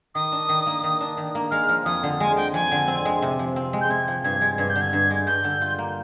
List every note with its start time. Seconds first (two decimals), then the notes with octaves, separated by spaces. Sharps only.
0.15 D#3 D#6
0.32 D4
0.49 D#3
0.66 A#3
0.83 D#3
1.01 D4
1.17 D#3
1.35 A#3
1.51 G#3 F6
1.69 F3
1.85 F2 D#6
2.03 D3
2.20 G#3 G#5
2.36 F3 G5
2.54 F2 G#5
2.72 D3
2.88 C4
3.05 G#3
3.22 C3
3.39 F3
3.56 C4
3.73 G#3
3.81 G6
3.90 C3 G#6
4.08 F3
4.24 G2 G#6
4.41 G#3
4.58 G2 G#6
4.70 G6
4.76 D3
4.81 G#6
4.93 G2
5.10 G#3
5.27 G2 G6
5.44 D3
5.61 F4
5.79 A#3